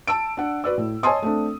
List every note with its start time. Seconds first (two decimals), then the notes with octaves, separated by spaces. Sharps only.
0.08 A5 E6 D7
0.37 D4 F#5
0.64 F#4 B4 D5 E6
0.78 A2
1.03 C#5 D#5 G#5 A5 C6 D#6
1.23 A3 C4 D4